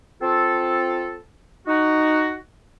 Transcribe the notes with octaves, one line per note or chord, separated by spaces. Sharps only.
C4 F4 A4
D#4 F#4